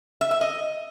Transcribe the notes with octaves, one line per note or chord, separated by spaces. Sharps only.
E5
E5
D#5